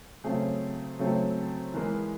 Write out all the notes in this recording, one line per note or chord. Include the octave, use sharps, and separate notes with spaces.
C#3 F#3 A3 C4 G#4
C#3 F#3 A3 C4
E3 G#3 B3 A#4